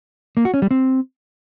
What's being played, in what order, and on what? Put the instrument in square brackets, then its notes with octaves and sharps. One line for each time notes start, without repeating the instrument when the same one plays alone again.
[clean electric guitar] A#3
F#4
C#4
G3
C4